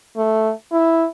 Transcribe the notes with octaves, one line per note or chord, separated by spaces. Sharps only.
A3
E4